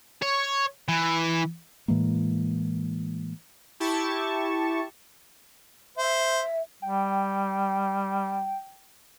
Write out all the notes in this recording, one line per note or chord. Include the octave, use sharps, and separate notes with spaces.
C#5
E3
A2 E3 G#3 A#3
E4 G4 A5 C#6
C5 E5
G3 G5